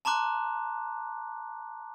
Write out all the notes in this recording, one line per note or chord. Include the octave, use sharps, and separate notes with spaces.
A5 A#5 C6 D6 F#6